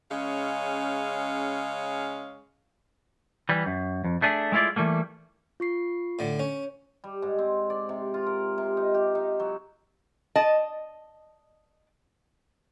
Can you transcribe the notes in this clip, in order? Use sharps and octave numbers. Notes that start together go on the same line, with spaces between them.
C#3 G#3 C#4 F5
E3 G3
F#2
F2
A3 D4 G#4
G#3 A3 E4 F4 D5
E3 G3 A3 A#3
F4 C#6 C7
A2 D3
C#4 C#5
G3
G#2
C4
D5
C3
F4
A#4
C3
D#4
G4
D#4
F#3
D5 D#5 A5